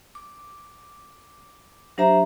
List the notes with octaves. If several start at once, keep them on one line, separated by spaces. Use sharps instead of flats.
D6
F#3 D4 G4 C5 E5 A#5